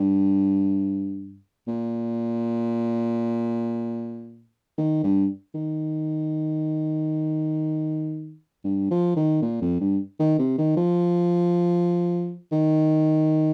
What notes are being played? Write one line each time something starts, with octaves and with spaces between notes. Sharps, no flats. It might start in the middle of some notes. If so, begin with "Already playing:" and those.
Already playing: G2
A#2
D#3
G2
D#3
G2
F3
D#3
A#2
F2
G2
D#3
C3
D#3
F3
D#3